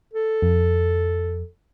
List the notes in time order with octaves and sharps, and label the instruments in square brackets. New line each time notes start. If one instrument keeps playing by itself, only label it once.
[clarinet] A4
[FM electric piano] F2